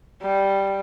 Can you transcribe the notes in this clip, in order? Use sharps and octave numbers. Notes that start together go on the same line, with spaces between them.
G3